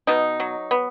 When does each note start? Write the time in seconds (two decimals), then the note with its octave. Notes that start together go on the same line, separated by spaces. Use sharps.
0.07 B2 D#4
0.40 F#3
0.71 B3